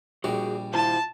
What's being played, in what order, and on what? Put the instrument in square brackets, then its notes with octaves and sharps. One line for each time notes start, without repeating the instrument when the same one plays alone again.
[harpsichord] A#1 G3 [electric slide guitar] F#4 G#4 G5
[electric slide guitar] E4 F4 C5 [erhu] A5